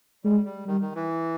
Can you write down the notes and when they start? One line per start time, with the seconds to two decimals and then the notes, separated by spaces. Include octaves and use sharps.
0.24 G3 G#3
0.45 G3
0.66 D#3 G3
0.81 D#3
0.95 E3